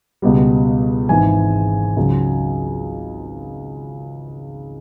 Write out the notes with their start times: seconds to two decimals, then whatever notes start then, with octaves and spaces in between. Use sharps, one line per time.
0.22 C#2 B2 G3
1.09 G#1 G#2 E3 G#5
1.97 C#2 C#3 F#3